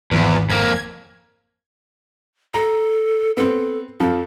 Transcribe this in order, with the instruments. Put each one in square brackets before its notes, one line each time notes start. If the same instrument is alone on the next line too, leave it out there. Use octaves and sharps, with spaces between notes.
[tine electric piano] G#1 [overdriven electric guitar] E2 [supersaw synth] E3 F3 B3
[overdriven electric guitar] F2 A#3 [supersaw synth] G#6
[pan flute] A4 [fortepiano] A#5
[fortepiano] B3 C4 [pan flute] A4
[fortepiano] F2 F3 [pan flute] A4